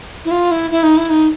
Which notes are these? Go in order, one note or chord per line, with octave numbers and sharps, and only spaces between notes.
E4
F4
E4
E4
D#4
E4
D#4